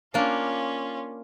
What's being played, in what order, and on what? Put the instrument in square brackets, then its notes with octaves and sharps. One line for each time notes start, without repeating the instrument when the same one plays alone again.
[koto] A#3 D4 [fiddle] C#4 F4